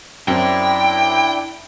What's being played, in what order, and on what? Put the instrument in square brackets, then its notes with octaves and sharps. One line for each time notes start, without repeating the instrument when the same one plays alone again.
[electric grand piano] F#2 C4 [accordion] D4 E4 [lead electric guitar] G5